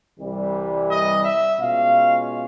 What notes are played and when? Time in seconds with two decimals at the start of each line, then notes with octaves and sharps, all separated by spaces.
0.20 C2 C3 E3 G3
0.89 D#5
1.25 E5
1.59 B2 G#3 C#4 F4 F5